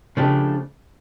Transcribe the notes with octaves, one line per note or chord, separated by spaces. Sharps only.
C#3 F3 A3 D4 G4